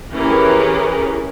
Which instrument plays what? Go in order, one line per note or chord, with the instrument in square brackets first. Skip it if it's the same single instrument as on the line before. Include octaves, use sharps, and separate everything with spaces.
[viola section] E3 C#4 G4 G#4 A#4 B4